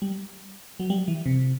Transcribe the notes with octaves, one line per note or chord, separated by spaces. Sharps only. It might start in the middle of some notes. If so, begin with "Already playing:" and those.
G3
F#3
G3
E3
C3